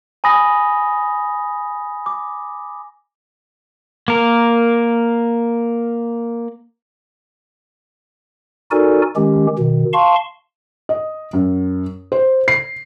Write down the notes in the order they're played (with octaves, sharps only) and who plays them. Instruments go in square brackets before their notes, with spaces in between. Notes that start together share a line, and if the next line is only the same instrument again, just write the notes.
[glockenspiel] G#5 B5 D#6 A#6
D6
[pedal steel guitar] A#3 A#4
[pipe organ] D#4 F#4 A4 A#4 D5 G#5
D#3 G#3 C#4 G4
B2 D#3
F5 A5 C6 C#6
[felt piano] D#5
F#2
C5
C7